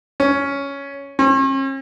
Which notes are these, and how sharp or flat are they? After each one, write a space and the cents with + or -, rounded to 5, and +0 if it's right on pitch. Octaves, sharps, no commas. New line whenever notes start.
C#4 +5
C#4 -45